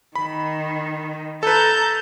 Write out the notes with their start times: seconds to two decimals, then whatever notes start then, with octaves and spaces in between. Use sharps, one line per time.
0.15 D#3 B5
1.43 A4 B4 A5 A#5 G6